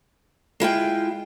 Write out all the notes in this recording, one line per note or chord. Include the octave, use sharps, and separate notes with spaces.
G#3 E4 F4 G5